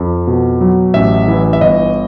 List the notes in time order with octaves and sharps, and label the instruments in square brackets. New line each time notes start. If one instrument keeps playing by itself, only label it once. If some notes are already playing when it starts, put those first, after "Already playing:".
Already playing: [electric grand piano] F2
B2
F#3
A1 E5
E3
E5
G1 D#5